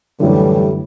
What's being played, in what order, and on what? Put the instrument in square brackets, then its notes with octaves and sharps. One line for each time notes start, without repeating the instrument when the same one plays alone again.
[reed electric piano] F#2 D3 [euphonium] A2 [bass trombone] E3 [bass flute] G3